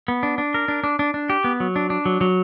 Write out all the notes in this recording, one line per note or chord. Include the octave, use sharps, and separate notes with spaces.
B3
D4
D4
A#4
D4
D4
D4
D4
G4
B3
F#3
D4
D4
F#3
F#3